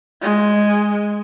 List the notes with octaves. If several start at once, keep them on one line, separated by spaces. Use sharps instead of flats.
G#3